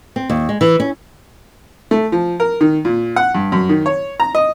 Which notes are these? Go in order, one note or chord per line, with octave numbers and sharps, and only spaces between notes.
C4
D#2
G#3
E3
C#4
A3
F3
A#4
D#3
A#2
F#5
G2
F#2
D#3
C#5
A#5
D#5